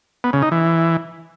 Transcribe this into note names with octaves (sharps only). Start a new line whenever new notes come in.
B3
C#3
D#4
E3